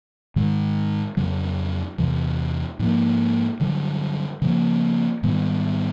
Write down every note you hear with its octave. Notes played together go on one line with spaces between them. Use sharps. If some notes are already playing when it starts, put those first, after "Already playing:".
G#2 D#3 G#3
F2 C#3 F#3
E2 C3 E3
G#2 F3 A#3
G2 D3 F#3
C#3 F3 A#3
G#2 D#3 G3 B3